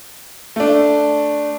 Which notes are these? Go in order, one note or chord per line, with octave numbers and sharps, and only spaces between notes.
A3 D4